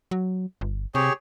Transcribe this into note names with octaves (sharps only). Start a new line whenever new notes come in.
F#3
G1
C3 G4 G#4 C#5